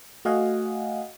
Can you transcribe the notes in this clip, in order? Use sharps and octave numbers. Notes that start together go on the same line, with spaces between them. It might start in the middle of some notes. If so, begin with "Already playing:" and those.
A3 F#4 D#5 F5 F#5 G#5